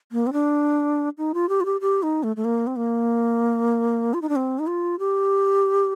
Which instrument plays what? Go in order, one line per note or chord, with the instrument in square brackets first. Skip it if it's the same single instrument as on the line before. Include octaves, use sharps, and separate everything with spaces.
[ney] A#3
C4
D4
D#4
F4
G4
F4
G4
G4
D#4
A3
A3
A#3
C4
A#3
F4
D#4
D4
C4
D#4
F4
G4